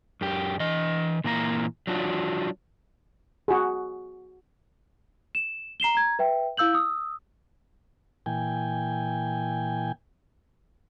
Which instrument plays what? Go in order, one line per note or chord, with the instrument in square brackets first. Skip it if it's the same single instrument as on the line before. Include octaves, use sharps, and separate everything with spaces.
[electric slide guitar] F#2 G4
E3 D#5
A#2 E3 A#3 A#5
F#3 D4 F4 F#4
[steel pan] F#4 G#4
[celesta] E7
A#5 C7 E7 G7
A#5 G#6
B4 E5 G5
E4 F5 E6 G6 F#7
D#6 E6
[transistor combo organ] A#2 E3 G5 G#5